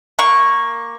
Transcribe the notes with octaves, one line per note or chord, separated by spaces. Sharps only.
A#3 C#6